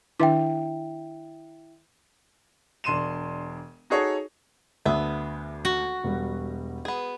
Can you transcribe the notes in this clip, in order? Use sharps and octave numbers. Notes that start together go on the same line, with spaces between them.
D#3 D4 E4 E5 G5 D6
E1 D4 C6 D#7 E7
D#4 F#4 G#4 A4 C#5
D2 B3 D4 E5 D#6
F#4
E1 G3
B3 G#4